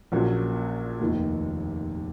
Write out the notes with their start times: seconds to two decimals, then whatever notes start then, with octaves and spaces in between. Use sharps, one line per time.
0.12 A#1 A#2 F#3 C#4 F#4
1.00 F1 D#2 D#3